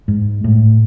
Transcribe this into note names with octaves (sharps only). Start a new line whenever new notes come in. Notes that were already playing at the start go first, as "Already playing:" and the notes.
G#2
A2